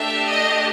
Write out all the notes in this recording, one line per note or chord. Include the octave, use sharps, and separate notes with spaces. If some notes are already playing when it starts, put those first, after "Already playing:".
Already playing: A3 D4 G4 E5
D#5